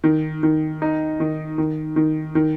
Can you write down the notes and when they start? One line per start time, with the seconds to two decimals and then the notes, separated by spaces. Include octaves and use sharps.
0.04 D#3
0.43 D#3
0.82 D#4
1.20 D#3
1.58 D#3
1.96 D#3
2.35 D#3